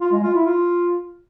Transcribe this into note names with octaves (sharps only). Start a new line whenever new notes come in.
F4
G#3
F4
E4
F4